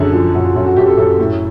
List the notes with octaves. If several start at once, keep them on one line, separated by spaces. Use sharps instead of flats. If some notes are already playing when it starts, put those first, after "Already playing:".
Already playing: F#2 D3 G#4 A4
F3
F#2 F#4
F4
F#2 F4
F#4
F#2 G4
A4
F#2 A4
A2